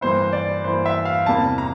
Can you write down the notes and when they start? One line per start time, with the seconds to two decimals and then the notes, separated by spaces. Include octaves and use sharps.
0.01 G2 E3 A#3 E4 C5
0.33 D5
0.64 G2 E3 A#3 E4 C5
0.86 E5
1.05 F5
1.26 E2 C3 G3 A#3 E4 A5
1.58 A#5